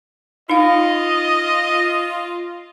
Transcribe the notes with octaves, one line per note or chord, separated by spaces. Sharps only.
D#4 F4 D#5 F5